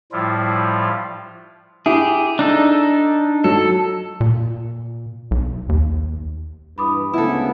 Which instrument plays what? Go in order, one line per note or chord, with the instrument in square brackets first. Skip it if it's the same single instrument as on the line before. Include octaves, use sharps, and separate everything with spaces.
[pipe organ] A2 F3 G3 E4 F4
[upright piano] E4 [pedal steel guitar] G4 G#4
[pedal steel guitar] D4 D#4 A4
[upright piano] F#3 [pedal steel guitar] A4
[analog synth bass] A#2
B1
D#2
[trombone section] G2 E3 [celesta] B5 D6 D#6
[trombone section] D2 G#2 C#3 [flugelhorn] B3 [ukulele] E4 A4